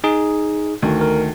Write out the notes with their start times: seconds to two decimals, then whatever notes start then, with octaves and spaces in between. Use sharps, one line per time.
0.04 D#4 G#4
0.82 D2 D#3
1.01 A#4